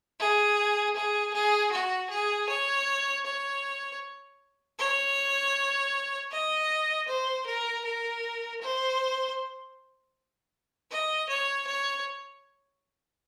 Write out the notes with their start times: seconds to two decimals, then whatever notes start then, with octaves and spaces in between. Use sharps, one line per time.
0.19 G#4
0.96 G#4
1.33 G#4
1.72 F#4
2.10 G#4
2.49 C#5
3.26 C#5
4.79 C#5
6.31 D#5
7.08 C5
7.46 A#4
7.85 A#4
8.61 C5
10.91 D#5
11.29 C#5
11.67 C#5